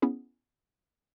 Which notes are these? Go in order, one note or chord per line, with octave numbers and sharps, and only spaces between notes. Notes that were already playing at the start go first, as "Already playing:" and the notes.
B3 C#4 E4 G#4